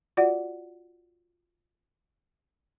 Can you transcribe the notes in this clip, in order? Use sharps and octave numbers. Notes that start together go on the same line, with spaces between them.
F4 F#4 D5 F#5